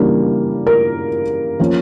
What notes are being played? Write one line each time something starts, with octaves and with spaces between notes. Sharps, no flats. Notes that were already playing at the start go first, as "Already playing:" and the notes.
Already playing: C#3 E3 G3 A#3 D4
A#4
F3 A#3 C#4 F4